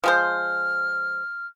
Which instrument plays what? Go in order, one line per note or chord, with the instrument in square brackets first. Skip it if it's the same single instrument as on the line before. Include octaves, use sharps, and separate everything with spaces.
[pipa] F3 G#3 C5 [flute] F6